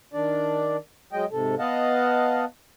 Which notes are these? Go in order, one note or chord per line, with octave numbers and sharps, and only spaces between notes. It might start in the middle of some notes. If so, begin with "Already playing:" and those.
D#3 D4 D5
F#3 G#3 D#5 G5
G#2 C3 A4
B3 D#5 F5 F#5 A5